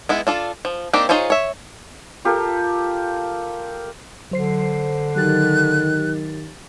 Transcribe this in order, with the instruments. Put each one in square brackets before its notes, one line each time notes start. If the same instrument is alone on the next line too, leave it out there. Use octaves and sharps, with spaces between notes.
[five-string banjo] G#3 B3 E4
D4 F4 A4
F3
A#3 C4 D4 D#4 G4
D#4 F4 G#4 C5 C#5
C#5 E5
[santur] F4 G4 A4 A#4
[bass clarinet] D3 [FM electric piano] F#3 C5 C7
[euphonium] D#3 [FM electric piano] F#3 G4 A6 [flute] F#6